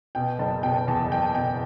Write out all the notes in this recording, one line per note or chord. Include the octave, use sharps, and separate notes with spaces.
B2 G5
F#1 A5
B2 G5
E2 A5
F#1 G5
B2 G5